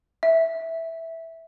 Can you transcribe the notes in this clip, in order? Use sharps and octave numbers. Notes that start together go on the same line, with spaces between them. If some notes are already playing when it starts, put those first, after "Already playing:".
E5